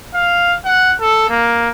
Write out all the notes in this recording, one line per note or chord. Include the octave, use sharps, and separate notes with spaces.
F5
F#5
A4
A#3